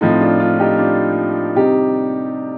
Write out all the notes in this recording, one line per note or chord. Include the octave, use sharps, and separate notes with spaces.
A2 F3 C4 D#4
D4 F4
D4 F4
D#4 G4
D4 F4
C3 G3 C4 D#4 G4